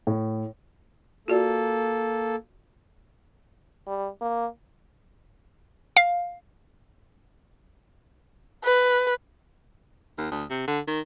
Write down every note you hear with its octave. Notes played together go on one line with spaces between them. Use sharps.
A2
A#3 F4 F#4 A4 D5
G3
A#3
F5
B4
D#2
D2
C3
D3
D#3